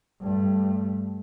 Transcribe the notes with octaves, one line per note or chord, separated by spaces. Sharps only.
G2 A3